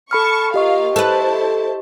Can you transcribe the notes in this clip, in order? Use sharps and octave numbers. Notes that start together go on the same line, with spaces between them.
A4 A5 B5 C#6 F6
A#3 F4 G4 D#5 F5 C#6
E4 A4 B4 C5 A5